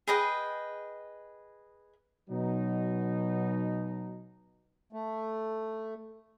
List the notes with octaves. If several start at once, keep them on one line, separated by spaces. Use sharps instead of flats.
G#4 B4 D#5 G5
B2 F#3 D#4
A3